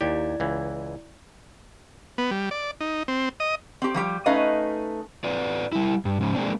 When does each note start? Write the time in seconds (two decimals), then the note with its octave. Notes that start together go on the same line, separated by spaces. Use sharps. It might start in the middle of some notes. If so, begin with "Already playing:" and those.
0.01 D#2 E4 G4 D5
0.40 C#2 E3
2.18 B3
2.31 G3
2.51 D5
2.80 D#4
3.08 C4
3.40 D#5
3.82 C4 G4
3.94 F3 G3 G4
4.26 A3 C#4 D#4 B4 D#5 F5
5.24 F4 B4 D5
5.72 G3 E4
6.05 G2
6.21 G#2 C#3 F3
6.35 G#3 A#3 C4 D4